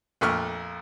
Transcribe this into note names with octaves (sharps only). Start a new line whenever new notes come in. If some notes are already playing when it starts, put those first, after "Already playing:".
A#1 F2 A3 C#6 F6